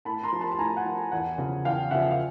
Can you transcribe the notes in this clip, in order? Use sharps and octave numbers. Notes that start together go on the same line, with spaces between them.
A2 A5 B5
A#5 C6
F3
A5 B5
A5
A2 G#5 A#5
F#5 G#5
F3
E2 F#5 G#5
C#3 F3
E2 F5 G5
C#3 F3 E5 F#5
F5